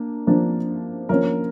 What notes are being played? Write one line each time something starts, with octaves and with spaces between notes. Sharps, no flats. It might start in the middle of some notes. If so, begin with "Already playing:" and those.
Already playing: A#3 D4
F3 A#3 D4
F3 A#3 C#4 A#4